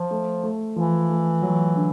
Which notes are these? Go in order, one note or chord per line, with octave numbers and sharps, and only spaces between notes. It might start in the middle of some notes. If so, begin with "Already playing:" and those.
Already playing: F3
A3
A3
E3 F3
A3
F#3
D3